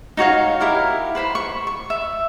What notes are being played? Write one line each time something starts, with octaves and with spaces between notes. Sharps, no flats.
D#4 F#4 C#5 F5
E4 G4 A#4 F5
B4 C5 G5 B5
C#6
C#6
E5